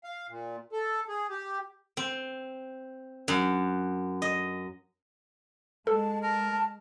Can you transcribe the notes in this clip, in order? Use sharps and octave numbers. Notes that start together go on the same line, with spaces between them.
F5
A#2
A4
G#4
G4
C4
F#2
D#5
G#3 A4 A5
A#4 A5